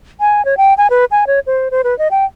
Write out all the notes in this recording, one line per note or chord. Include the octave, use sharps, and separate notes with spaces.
G#5
C#5
G5
G#5
B4
G#5
C#5
C5
C5
B4
D#5
G5